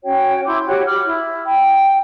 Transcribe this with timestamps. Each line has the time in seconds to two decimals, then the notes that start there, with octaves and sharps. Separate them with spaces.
0.04 C#4 F#4 C#5 G5
0.46 E4 C6 D6 G6
0.67 F#4 G4 C#5 G5
0.86 B5 D6 F6
1.04 E4
1.46 G5